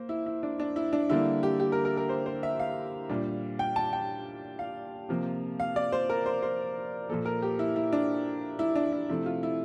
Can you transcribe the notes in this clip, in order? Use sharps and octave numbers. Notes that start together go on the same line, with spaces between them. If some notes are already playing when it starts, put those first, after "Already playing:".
Already playing: A#3 C5
E4
E4
D4
D4
E4
D4
D3 G3 A#3 E4
G4
G4
A#4
A#4
A#4
C5
C5
E5
F5
A#2 G3 D4
G5
A5
G5
F5
C3 F3 A#3
F5
D5
C5
A#4
C5
C5
A#2 F3 A#3 A4
A#4
G4
E4
E4
D4
E4
D4
E4
C3 F3 A3 E4
F4
E4